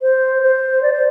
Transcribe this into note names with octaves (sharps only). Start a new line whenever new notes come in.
C5
C5
D5
C5